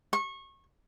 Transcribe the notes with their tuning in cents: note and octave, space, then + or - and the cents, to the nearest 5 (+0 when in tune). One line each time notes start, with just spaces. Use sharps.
C#6 -25